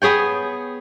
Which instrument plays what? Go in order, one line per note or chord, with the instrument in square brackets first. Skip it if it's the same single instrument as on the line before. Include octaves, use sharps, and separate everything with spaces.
[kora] B3 G#4 C#5 G5